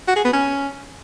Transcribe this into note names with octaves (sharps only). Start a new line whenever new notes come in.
F#4
G#4
B3
C#4